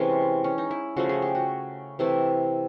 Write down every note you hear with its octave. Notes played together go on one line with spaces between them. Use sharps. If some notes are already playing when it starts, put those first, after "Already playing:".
Already playing: C3 E3 G#3 C#4
C#4
D#4
E4
C#3 F3 A3 F#4
G#4
G4
F#4
C3 E3 A3 E4